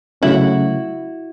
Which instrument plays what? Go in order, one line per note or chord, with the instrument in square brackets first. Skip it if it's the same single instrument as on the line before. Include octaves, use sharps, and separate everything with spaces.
[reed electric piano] C#3 F#3 A3 C#4 [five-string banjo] E4 F#4